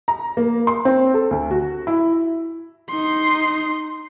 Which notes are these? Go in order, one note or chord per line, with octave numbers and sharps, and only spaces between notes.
A#5
A#3
C6
C4
A4
D2
F#4
E4
D#4 C6